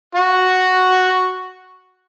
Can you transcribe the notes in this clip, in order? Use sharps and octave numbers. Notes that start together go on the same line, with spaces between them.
F#4 C#6